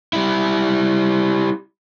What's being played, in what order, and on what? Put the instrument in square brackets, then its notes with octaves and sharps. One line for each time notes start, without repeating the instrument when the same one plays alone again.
[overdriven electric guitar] G3 E4